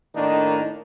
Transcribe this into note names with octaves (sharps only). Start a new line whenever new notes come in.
A2 D#3 A#3 D4 D#4